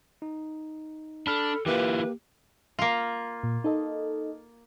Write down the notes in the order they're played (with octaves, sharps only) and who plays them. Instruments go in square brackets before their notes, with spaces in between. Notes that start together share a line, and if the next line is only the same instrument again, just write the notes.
[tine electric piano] D#4
[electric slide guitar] D4 [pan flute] A4 [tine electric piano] B5 F6
[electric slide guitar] E3 E4 F4 [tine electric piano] A#3 G4 [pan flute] B4
[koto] A#3 F4
[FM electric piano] A#2
D#4 A4 D#5